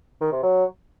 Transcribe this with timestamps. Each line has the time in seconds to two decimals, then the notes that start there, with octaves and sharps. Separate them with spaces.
0.21 D#3
0.32 C3
0.43 F#3